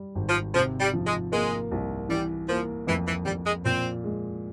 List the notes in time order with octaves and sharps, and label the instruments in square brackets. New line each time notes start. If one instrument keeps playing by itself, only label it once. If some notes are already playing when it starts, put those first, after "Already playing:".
Already playing: [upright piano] G3
G#1
[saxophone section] F3
[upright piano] C3 [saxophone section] F3
[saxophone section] G3
[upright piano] F3
[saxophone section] G#3
[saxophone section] G#3 [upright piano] A#3
[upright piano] C2
[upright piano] E3 [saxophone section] G3
[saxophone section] F3 [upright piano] A#3
[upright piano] F2 [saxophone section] E3
[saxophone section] E3
[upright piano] F2 [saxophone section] G3
[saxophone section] G#3
[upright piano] A#2 [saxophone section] C4
[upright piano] G#3